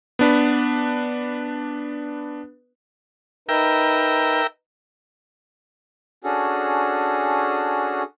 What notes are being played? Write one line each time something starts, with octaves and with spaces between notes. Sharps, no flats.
B3 D4 B4
D#4 A#4 B4 E5 G5
C#4 D4 F#4 G#4 A4